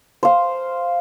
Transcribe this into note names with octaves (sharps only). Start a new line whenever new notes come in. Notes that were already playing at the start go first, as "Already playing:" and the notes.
C5 F5